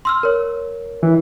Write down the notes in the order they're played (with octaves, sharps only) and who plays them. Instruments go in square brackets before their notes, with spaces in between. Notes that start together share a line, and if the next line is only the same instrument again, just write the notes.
[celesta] C6 E6 F6
A#4 C#5
[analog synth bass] E3